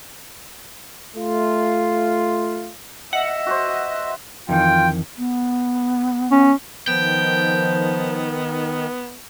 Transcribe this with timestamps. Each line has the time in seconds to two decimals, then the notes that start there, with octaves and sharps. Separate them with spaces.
1.16 A3 F4
3.13 D#5 E5 F#5
3.46 F#4 B4 C5
4.49 F2 D#3 E3 F4 G5
5.18 B3
6.31 C#4
6.88 D#3 F3 B3 G5